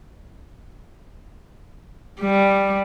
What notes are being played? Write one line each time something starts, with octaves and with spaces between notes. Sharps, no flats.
G3